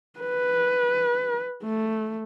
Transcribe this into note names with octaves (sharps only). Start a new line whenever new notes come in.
B4
A3